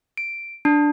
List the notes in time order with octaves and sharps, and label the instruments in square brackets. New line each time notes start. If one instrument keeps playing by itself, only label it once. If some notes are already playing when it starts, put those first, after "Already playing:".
[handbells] D7
D4